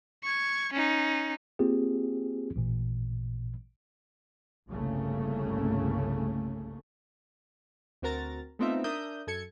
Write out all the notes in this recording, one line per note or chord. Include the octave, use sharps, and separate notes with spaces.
C#6 G#6
C#4 D#4
A#3 C4 F4 G4 G#4
A1 A#2
G1 C2 C#3 A3 A#3 C#4
D2 C4 F#4 A#4 A#5 A6
A3 B3 C4 D#4 F4 E5
D4 A#4 E5 D#6 G6
F#2 A4 G#6 C#7